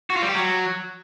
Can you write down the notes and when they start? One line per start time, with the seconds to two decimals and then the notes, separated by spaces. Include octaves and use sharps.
0.10 F#4
0.16 F4
0.22 G3
0.28 G4
0.35 F#3